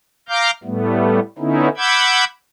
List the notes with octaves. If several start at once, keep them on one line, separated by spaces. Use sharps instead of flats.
F5 A#5 D6 F6 G6
A2 G3 A3 B3
D3 B3 C#4 D#4 E4
F#5 B5 D6 E6 G6 G#6